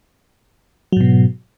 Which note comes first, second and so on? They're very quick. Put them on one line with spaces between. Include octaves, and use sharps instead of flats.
F#3 G#2 B2